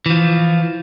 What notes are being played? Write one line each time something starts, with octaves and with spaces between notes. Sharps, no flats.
E3 F3